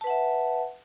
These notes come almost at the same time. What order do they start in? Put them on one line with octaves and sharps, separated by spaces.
A5 B4 F#5 E5